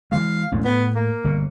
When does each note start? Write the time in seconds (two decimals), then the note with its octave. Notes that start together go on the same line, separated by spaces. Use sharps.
0.12 E3 F3 G#3 F5
0.52 E1 A1 G#2
0.65 A2 B3
0.95 A#3
1.24 G1 B2